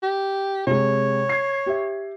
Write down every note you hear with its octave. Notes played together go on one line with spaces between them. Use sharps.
G4
C3 G#3 C#5
G#6 C7
G4 E5